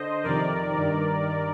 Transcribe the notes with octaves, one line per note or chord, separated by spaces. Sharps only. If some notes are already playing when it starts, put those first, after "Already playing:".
Already playing: D3 C5 D#5
F2 C3 D#3 A#4 D5
G2 D#3